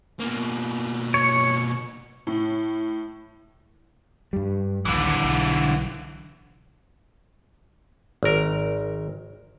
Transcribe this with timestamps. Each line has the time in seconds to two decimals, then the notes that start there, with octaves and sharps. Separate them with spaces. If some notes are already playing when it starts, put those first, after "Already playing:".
0.20 B2 A#3
1.14 C#5
2.27 A2
4.33 G2 G3
4.85 A#1 D#2 D3 E3
5.24 B1
8.23 G#1 A#4